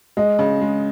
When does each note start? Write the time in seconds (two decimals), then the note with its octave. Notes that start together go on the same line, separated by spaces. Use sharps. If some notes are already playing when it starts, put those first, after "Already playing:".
0.17 G#3 D#5
0.39 C#3
0.61 G#3